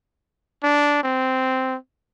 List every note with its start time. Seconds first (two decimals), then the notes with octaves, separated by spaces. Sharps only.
0.63 D4
1.04 C4